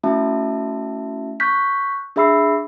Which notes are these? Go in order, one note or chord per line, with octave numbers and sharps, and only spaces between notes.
A3 C#4 E4 F#4 E5 A5
C#6 F#6 G6 B6
D4 G#4 E5 B5 E6 C7